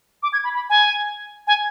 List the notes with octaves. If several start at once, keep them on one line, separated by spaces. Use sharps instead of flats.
D6
G#6
B5
B5
G#5
G#5